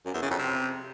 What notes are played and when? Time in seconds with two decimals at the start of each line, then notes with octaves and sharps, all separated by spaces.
0.06 F#2
0.14 E2
0.22 C#3
0.30 F2
0.39 C3